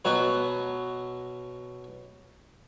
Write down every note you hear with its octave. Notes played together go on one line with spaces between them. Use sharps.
B2 F#3 B4